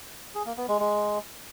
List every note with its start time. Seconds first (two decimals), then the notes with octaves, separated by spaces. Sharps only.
0.35 G#4
0.46 A#3
0.57 B3
0.68 G#3
0.79 G#3